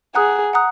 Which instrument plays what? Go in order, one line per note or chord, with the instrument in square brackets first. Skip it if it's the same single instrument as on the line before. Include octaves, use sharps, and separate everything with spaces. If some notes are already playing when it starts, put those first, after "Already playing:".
[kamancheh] G#4 [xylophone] F#5 A#5 D#6 F#6
[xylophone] F#5 A#5 D#6 F#6